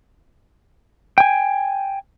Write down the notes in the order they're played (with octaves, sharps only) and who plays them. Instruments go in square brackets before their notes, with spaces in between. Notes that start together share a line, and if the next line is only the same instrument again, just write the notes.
[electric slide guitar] G5 G#5